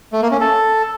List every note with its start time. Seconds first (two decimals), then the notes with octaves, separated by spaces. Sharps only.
0.13 A3
0.22 A#3
0.31 C#4
0.41 A4